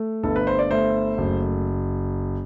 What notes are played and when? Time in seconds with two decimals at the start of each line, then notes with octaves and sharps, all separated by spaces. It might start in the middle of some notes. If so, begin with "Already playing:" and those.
Already playing: A3
0.23 G1 A4
0.36 B4
0.47 C5
0.59 D5
0.71 A3 C5 E5
1.18 F#1